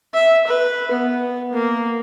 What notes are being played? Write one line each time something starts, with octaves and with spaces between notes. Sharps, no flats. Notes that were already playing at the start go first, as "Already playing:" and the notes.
E5
B4
B3
A#3